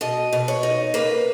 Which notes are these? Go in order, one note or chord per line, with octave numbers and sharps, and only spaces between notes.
B2 D#5
B2
C#5
D#4
A#3 B4